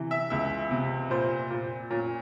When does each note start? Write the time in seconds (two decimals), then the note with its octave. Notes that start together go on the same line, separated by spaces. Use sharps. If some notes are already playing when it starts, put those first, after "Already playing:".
Already playing: C3 E3
0.11 E5
0.30 C#2 E5
0.71 C3
1.10 A#2 C5
1.50 A#2
1.90 A#2 C#4